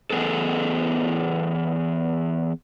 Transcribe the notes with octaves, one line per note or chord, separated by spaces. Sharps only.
E2 G3 B3 G#4 A4